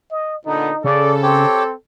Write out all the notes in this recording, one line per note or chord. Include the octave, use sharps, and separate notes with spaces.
D#5
A#2 D3 B3 D#4
C#3 A4 D5
C4 G4 C#5 G5